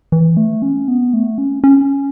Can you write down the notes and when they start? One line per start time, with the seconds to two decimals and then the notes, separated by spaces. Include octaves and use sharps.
0.12 E3
0.37 A3
0.62 C#4
0.88 B3
1.13 A3
1.38 C#4
1.64 C#4